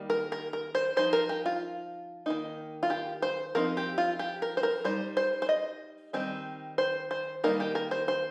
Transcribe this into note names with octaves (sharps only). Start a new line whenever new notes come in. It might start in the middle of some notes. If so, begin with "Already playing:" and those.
Already playing: D#3 G3 A#3 D#4
A#4
A#4
A#4
C5
F3 D#4 C5
A#4
G4
F4
D#3 A#3 D#4
F4
G4
C5
F3 C4 D#4 A#4
G4
F4
G4
A#4
C5
A#4
G3 D#4 C5
C5
C5
D#5
D#3 G3 C4 D#4
C5
C5
D#3 G3 A#3 D#4 A#4
G4
A#4
C5
C5